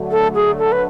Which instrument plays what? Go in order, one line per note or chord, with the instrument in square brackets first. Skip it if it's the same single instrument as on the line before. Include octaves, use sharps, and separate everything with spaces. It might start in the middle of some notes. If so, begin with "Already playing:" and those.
Already playing: [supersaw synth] D3 F#3 A3
[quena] A4
G#4
A4
B4